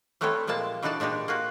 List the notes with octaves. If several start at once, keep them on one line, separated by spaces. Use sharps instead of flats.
G3 A3 B3 C4 A4 C#5
A#2 F3 G#3 A#3 A5
B2 E3 D4 D#4 D5 A5
A#2 G#3 D4 D#4 G4
A#3 F4 F#4